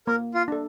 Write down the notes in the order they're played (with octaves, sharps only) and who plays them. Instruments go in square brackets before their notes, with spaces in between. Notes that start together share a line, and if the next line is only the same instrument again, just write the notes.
[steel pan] A#3 [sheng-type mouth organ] A#4
[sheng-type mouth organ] F4
[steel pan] D4 A4